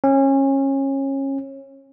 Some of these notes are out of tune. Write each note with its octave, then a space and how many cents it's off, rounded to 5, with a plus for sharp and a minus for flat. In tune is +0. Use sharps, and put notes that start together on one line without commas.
C#4 -25